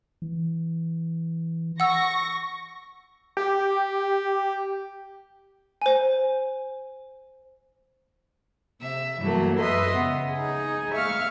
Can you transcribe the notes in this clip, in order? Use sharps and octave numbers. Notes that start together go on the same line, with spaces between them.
E3
F#5 C#6 E6 A#6
G4
C5 G#5
C3 E5
G2 E3 F#3 A3 A#3
F#2 B4 D#5 E5 C6
C#3 B3
D#4 G#4
E5 F5 C#6 F6